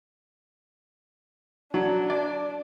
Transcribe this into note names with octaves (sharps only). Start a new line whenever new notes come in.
F#3 D4
D5